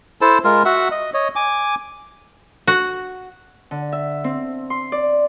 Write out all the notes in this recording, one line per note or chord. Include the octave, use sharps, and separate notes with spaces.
E4 A4 C5 A5
G#3 F4 A#4
F#4 E5 F#5
D#5
C#5 D#5
G#5 D6
F#4
D3
E5
C4
C6
D5